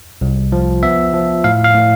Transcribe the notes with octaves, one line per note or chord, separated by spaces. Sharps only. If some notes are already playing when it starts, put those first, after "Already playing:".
C2
F3
B3 E5
F3
A2 F5
F5
A2